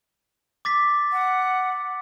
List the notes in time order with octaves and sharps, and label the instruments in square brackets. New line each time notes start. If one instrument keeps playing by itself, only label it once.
[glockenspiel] D6 A6 B6
[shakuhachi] F#5